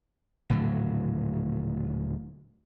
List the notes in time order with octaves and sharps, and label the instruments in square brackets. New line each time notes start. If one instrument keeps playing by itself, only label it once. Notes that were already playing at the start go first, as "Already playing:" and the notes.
[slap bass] D#1 A2 D3 F#3